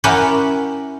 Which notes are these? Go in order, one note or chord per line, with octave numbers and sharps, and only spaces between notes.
C#4 E4 G4 A#4 F#5 G5